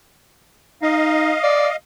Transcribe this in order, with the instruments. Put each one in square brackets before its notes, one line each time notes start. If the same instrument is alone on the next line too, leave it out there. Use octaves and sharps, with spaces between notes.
[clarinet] D#4 [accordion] D#5 F5
[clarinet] D5